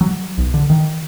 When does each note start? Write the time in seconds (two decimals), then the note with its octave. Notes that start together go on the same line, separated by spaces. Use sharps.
0.01 F#3
0.38 B1
0.54 D3
0.70 D#3